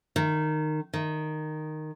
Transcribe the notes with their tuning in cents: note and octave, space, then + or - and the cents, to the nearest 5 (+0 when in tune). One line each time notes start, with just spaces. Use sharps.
D#3 -15
D#3 -10